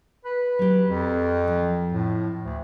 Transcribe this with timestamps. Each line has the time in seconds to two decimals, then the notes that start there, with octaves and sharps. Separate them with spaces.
0.25 B4
0.59 F#3 G4
0.88 F2
1.48 F3
1.93 A2
2.44 D2